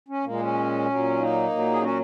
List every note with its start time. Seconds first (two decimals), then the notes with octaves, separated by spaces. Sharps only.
0.08 C#4
0.24 A#2 G#3 A#3
0.40 C#4
0.87 A#2 F#3
1.18 A#3 D#4
1.50 A#2 F#3
1.71 G#4
1.81 C#4 F#4